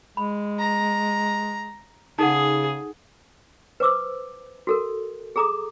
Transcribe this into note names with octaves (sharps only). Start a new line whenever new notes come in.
G#3 B5
A#5
C#3 D#4 G#4 A4 F#5
B4 C5 D6 E6
F#4 A4 A#4
G#4 A4 A#5 D6 D#6